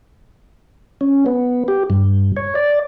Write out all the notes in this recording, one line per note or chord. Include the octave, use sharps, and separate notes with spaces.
C#4
B3
G4
G2
C#5
D5